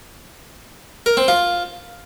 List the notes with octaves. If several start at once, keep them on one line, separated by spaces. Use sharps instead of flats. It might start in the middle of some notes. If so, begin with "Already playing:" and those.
A#4
C4
F4